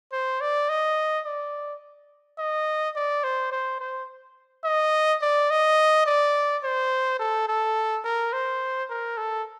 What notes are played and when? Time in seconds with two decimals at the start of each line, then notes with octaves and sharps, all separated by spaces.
0.12 C5
0.41 D5
0.69 D#5
1.25 D5
2.38 D#5
2.96 D5
3.24 C5
3.52 C5
3.80 C5
4.64 D#5
5.22 D5
5.50 D#5
6.06 D5
6.64 C5
7.19 A4
7.48 A4
8.04 A#4
8.33 C5
8.90 A#4
9.17 A4